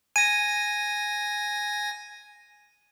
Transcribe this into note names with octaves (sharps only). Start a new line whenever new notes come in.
G#5 A#6 D#7